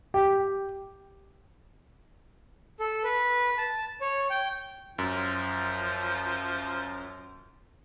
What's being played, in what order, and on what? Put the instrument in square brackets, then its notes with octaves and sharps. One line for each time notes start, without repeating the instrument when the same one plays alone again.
[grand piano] G4
[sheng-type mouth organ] A4
B4
A5
C#5
G5
[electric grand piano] F#2 [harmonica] F3